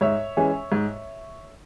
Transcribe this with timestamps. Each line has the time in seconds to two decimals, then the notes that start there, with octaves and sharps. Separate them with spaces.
0.01 G#2 C#5 E5
0.37 E3 G#3 C#4
0.72 G#2